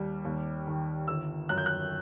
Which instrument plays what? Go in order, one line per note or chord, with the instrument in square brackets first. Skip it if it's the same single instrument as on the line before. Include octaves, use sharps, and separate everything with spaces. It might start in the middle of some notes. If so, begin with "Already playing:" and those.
Already playing: [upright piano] D#2 G3
D#2
D#3
G1 E6
F#2 F#6
G6
F#6